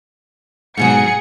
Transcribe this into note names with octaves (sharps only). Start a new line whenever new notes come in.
G#2 B2 F#3 G#4 C#7